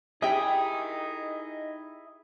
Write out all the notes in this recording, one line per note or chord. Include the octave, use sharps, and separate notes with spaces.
D#4 E4 G4 G#4 D#5 E5 G5